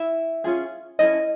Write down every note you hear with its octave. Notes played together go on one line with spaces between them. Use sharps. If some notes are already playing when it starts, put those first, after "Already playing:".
Already playing: E4 E5
C#4 F4 G#4
C#4 D#4 E4 A4 D#5